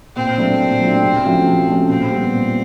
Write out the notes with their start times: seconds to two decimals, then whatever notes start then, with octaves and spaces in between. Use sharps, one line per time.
0.16 A#2 C4
0.38 F#3 A3 D4
0.59 A#2
0.81 F#3 A3 D4
1.03 C3
1.24 F3 A3 C#4 F#4
1.45 C3
1.67 F3 A3 C#4 F#4
1.89 A#2 C4
2.10 G3 B3
2.32 A#2